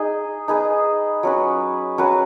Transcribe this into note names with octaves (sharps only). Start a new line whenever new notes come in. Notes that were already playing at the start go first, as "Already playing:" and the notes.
Already playing: D#4 G#4 D#5
D#4 G#4 B4 D#5
F#3 C#4 B4
F#3 C#4 B4